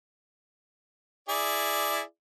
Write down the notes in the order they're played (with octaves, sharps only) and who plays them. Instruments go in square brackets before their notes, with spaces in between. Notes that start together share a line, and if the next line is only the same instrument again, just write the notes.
[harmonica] E4 G#4 D5